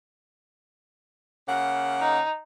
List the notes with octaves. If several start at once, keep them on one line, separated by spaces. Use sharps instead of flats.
C#3 A#3 F#5
D#4